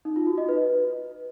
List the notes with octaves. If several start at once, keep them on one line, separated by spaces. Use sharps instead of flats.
D#4
F4
F#4
D#5
B4